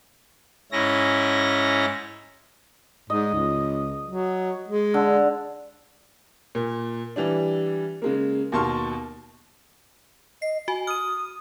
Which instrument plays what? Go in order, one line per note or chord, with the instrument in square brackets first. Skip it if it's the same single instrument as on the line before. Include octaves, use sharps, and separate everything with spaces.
[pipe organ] G#2 C#4 E4 A#6
[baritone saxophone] G#2 [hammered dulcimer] D#5
[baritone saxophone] C#2
F#3
G#3
[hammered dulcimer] D3
[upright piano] A#2
E3 G3 D4
C#3 G#3 A#3
D#2 B2 A5 C6 C#6 F6
[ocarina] D#5 [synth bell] C7
[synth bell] F#4 [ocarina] G#5
[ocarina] D#6 [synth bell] F6 D#7